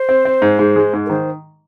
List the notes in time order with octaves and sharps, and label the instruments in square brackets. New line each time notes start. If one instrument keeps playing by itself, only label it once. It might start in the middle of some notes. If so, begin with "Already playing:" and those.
Already playing: [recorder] C5
[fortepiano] C4
C4
G#2
G#2
G#3
G#2
[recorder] A#4
[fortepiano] D#3 [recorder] C5